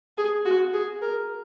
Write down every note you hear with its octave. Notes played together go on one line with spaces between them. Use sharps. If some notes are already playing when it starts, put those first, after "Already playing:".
G#4
F#4
G#4
A#4